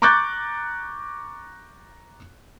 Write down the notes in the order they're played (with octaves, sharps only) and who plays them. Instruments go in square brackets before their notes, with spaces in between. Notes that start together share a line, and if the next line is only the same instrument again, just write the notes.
[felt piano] A#5 C#6 D6 F#6 G6 A6